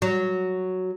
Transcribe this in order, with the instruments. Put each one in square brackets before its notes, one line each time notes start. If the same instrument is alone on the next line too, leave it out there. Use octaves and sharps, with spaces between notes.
[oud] F#3